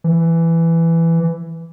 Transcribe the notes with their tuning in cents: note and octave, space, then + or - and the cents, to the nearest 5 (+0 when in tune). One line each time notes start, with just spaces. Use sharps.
E3 +10